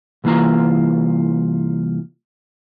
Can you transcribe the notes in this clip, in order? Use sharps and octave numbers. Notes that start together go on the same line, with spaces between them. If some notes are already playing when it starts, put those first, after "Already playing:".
C2 E3 A#3 F4 A#5